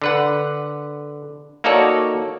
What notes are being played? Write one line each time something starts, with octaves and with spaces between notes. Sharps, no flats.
D3 B4 F#5
A#3 D#4 F#4 A4 C#5 D5